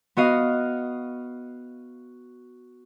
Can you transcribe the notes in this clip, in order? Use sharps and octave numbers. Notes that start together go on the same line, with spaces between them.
B3 F#4 D#5 F5